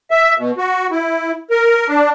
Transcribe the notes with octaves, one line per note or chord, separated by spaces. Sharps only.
E5
B2
F#4
E4
A#4
D4